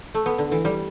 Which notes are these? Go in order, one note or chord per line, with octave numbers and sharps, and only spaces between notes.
A3
B3
D3
E3
G3